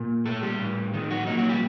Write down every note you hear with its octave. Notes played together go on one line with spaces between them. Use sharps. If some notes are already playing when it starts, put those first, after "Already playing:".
Already playing: A#2
A3 A4
G3 G4
A2
D#3 D#4
F#3 F#4
A#2 D#3 D#4
F#3 F#4
G3 G4